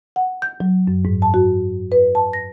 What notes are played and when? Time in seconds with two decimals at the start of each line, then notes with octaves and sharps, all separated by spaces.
0.16 F#5
0.42 G6
0.60 F#3
0.88 F#2
1.05 G#2
1.22 A5
1.34 F#4
1.92 B4
2.15 A5
2.33 A#6